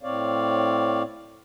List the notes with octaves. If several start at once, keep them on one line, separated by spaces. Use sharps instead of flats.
A2 C4 C#5 D5 F5